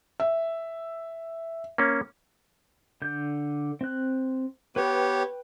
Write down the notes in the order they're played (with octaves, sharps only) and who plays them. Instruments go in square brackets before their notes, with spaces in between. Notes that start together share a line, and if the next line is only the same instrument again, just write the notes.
[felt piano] E5
[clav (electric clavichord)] A#3 C#4
[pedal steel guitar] D3 G6
C4 F#6
[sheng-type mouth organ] B3 G4 C#5 [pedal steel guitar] B4 G5